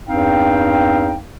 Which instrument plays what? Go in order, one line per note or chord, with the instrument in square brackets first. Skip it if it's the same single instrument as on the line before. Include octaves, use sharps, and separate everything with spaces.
[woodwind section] E2 G2 C4 D#4 F5 G5